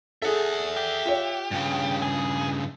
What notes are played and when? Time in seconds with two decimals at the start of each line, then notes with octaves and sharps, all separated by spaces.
0.22 G#4 A4 E5 F#5
0.77 G4
1.06 F4 C#5
1.51 G2 C#3
2.02 G#4